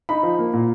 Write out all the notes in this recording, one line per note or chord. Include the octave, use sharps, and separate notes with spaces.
D#4 B5
F3
A#3
A#2